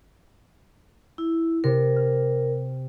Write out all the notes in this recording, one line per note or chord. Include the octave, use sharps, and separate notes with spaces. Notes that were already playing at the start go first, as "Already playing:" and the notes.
E4
C3 A#4
F6